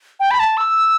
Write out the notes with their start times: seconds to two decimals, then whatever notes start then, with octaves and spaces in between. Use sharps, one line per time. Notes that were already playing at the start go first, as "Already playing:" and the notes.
0.20 G5
0.31 B5
0.40 A5
0.57 E6